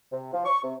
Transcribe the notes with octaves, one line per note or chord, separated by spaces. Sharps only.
C3
F3
C#6
C3